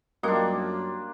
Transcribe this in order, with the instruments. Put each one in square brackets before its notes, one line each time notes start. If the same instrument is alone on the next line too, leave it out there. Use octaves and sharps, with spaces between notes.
[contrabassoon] F#2 [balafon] G3 A#4 F5 [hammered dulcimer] A#3 D4 [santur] F4 G4